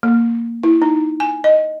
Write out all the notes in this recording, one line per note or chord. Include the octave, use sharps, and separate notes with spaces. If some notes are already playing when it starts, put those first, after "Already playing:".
A#3
E4
D#4
G#5
D#5